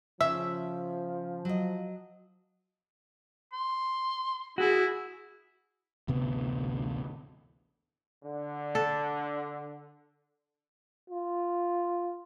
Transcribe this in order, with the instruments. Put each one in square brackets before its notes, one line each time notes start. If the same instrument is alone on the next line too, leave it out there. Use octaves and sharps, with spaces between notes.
[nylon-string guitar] C#3 [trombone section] F3 [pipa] E5
[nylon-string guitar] F#3 D#5
[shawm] C6
[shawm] E4 [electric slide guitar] F#4 [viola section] G#4
[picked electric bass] A1 D2 C3 B3
[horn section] D3
[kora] A4
[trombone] F4